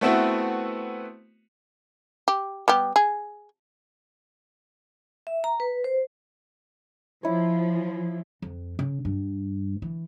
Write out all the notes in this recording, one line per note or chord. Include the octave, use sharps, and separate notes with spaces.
A3 B3 C4 E4 F#4 B4
G4
G3 B3 G4
G#4
E5
A#5
B4
C5
F3 E4 C#5
F2
C#3
G2
E3